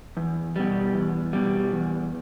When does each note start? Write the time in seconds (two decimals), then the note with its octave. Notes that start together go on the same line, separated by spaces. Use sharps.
0.17 E2
0.56 B2 G3
0.95 E2
1.33 B2 G3
1.72 E2